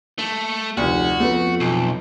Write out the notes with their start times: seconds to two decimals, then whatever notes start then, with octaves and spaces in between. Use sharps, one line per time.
0.19 A3
0.77 F1 D2 F#4
1.20 F2 A3 B3 B4
1.60 B1